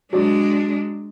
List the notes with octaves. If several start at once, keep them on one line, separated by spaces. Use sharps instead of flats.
F#3 G#3 D4 D5